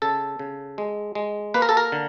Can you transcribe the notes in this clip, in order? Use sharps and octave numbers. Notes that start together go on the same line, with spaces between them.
C#3 A4
C#3
G#3
G#3
A#3 B4
A#4
A4
A#4
D3